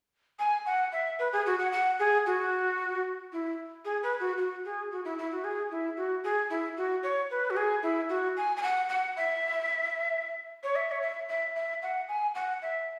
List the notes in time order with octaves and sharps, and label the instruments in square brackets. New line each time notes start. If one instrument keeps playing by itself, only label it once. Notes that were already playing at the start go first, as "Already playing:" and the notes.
[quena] G#5
F#5
E5
B4
G#4
F#4
F#5
F#5
G#4
F#4
E4
G#4
B4
F#4
F#4
G#4
F#4
E4
E4
F#4
G#4
E4
F#4
G#4
E4
F#4
C#5
B4
F#4
G#4
E4
F#4
G#5
G#5
F#5
F#5
E5
C#5
E5
C#5
E5
E5
E5
F#5
G#5
F#5
E5